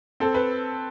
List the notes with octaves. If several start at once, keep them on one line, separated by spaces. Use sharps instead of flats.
C4 A4
B4